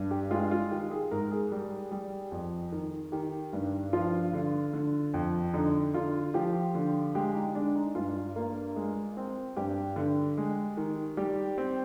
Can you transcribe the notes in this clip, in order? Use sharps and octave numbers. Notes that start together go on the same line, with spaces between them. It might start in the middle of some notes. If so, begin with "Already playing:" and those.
Already playing: G2
G4
G#3 F4
F4
D#3 G4
G#4
G#2 A#4
G#4
G3
G3
F2
D#3
D#3 G4
G2
F3 F4
D3
D3
F2
D3 D#4
D3 F4
F3 G4
D3
G#3 G4
D#4
G#3 D4
D#4
G2 F4
A#3
G#3
C4
G2 G4
D3
G#3
D#3
G3 G4
C4